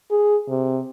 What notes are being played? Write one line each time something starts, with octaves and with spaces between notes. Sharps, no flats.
G#4
C3